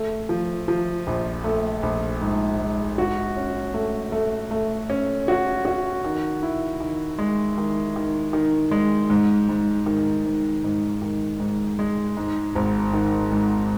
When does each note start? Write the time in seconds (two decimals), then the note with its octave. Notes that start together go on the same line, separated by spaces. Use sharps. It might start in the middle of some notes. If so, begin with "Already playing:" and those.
Already playing: A3
0.29 F3
0.68 F3
1.07 A#1
1.44 A3
1.83 A#1
2.22 G#2
2.60 G#2
2.98 F#4
3.37 C#4
3.74 A3
4.12 A3
4.51 A3
4.90 C#4
5.28 F#4
5.65 F#4
6.05 D#3
6.43 E4
6.81 D#3
7.19 G#3
7.58 D#3
7.96 D#3
8.33 D#3
8.71 G#3
9.10 G#2
9.49 G#2
9.86 D#3
10.25 G#2
10.64 G#2
11.02 D#3
11.40 G#2
11.79 G#3
12.17 G#2
12.55 G#1
12.93 D#3
13.32 G#2